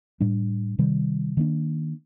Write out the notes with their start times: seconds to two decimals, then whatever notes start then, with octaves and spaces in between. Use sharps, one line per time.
0.20 A2 G3 D4
0.79 C3 D#3 G3
1.37 D#3 A#3 D4